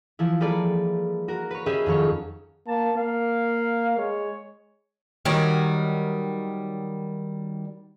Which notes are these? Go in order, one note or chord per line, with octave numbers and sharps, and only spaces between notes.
E3 F3 E4
G3 G#3 A#3 A4 B4 D5
F#4 A#4
B4 C#5
C#4 G4 G#4 B4 D#5 E5
F2 D#3 F#3 C#5 C#6
A#3 A5
A#3 F5
G#3 C#5
D#3 F#3 G3